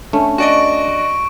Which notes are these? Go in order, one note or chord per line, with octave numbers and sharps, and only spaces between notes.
A3 C#4 D4
F#4 D5 D#5 C#6 D7